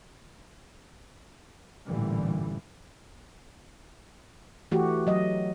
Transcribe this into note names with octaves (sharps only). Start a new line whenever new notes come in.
A1 G2 A#2 D3 E3 G3
E3 A3 F#4 G4
F#3 D#5